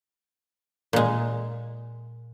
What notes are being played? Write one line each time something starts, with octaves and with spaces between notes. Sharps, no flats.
A#2 G#3